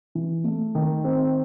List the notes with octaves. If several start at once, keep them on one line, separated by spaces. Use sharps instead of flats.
E3
A3
D#3
C4